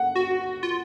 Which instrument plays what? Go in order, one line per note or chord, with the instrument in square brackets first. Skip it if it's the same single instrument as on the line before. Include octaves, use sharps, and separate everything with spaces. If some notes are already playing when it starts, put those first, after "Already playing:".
Already playing: [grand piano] F#5
[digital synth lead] F#4
F4